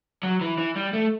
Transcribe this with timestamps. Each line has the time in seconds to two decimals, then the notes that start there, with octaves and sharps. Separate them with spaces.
0.23 F#3
0.41 E3
0.58 E3
0.76 G3
0.93 A3